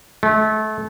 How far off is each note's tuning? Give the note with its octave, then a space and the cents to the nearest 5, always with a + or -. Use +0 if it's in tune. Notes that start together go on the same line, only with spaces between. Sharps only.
A3 -30